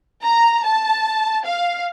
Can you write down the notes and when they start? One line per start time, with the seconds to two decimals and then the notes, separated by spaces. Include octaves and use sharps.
0.24 A#5
0.64 A5
1.45 F5